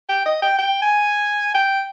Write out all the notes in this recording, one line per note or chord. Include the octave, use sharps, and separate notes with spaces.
G5
D#5
G5
G5
G#5
G5